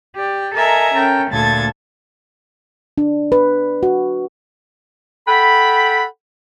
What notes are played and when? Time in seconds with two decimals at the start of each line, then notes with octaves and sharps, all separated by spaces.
0.16 G4 D5
0.54 A4 A#4 D#5 E5 G#5 A#5
0.94 C#4 A4 A#4 G5
1.31 D2 A#2 A4 A5 G#6 A6
2.98 D4
3.32 B4
3.83 F#4
5.27 A4 F#5 G5 B5